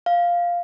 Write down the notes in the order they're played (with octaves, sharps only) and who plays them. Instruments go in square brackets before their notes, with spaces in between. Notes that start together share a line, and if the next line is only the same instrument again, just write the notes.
[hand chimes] F5